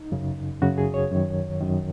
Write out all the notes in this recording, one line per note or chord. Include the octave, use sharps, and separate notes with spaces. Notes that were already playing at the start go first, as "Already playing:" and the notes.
Already playing: D#4
F#2 C#3
F#2 C#3 F#4
G#4
C#5
F#2 D#3
F#2 D#3